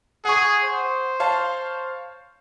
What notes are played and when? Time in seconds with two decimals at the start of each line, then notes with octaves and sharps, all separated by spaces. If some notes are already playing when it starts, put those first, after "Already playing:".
0.25 G#4 F#5 C#6
0.64 C5
1.20 C#5 F5 A5